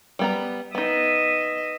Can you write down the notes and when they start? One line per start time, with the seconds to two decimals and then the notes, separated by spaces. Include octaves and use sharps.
0.19 G3 B3 A#5
0.75 B3 D#4 D#5 E5